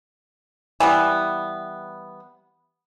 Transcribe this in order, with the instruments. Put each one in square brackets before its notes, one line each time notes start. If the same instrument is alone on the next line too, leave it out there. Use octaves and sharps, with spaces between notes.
[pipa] E3 G3 B3